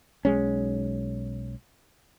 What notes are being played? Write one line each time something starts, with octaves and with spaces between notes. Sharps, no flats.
B1 G#3 C#4